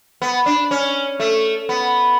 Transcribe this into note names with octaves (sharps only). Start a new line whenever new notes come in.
B3
D4
C#4
A3
B3